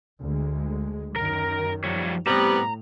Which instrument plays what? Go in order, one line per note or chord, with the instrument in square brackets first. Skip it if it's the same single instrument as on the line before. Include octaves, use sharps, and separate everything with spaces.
[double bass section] D2 G#3
[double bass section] F#2 D#3 [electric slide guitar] A#4
[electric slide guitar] F3 G3 C#5
[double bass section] A2 [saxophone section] C3 G3 B3 [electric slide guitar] A#5